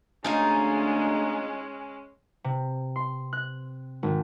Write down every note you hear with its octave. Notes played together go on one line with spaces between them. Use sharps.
D2 G#3 C#4 D#4 F4 G#4
C3
C6
F#6
G#1